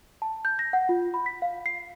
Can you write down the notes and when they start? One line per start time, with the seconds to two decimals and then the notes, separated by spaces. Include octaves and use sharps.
0.22 A5
0.45 G6
0.59 A#6
0.73 F#5
0.89 F4
1.14 B5
1.26 B6
1.42 F5
1.66 C7